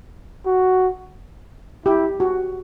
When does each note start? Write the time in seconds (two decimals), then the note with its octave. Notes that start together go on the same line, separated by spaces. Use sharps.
0.46 F#4
1.86 E4 G4
2.20 F#4